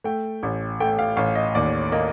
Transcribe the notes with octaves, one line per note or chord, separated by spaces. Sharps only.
A3 G5
A1
A3 G5
F5
A1 F5
D#5
D#2 D5
A#3 D#5